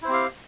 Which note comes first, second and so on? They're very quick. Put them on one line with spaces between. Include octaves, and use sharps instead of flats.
E4 C5 C4 G4 F5